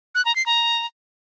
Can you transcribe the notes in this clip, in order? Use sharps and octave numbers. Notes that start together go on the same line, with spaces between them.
F#6
A#5
C7
A#5